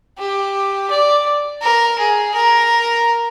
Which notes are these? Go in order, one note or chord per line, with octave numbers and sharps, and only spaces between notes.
G4
D5
A#4
G#4
A#4